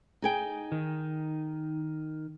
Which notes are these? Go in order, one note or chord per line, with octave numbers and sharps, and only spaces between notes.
D#4 G#4 G5
D#3